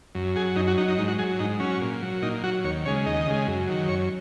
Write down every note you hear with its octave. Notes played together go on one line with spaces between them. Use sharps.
F#2
F#3 G#4
F#2 D#4
F#4
F#3 D#4
D#4
G#2 D#4
F#4
F#3 G#4
G#2 D#4
F#3 C#4
A#2
F#3
A#2 D#4
F#3 F#4
D#2 C#5
C#3 G#3 C#5
D#2 D#5
C#3 G#3
F#2
D#3 F#3
F#2 C#5